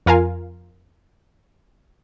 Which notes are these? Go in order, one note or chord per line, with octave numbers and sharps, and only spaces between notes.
F2 F4 A#4 F5 G#5